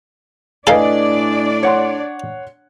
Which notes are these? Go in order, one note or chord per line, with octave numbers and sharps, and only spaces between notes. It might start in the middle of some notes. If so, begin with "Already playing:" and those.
A2 D4 A4 B4 D5 D#5 F5 G#5
C#5 F#5 C6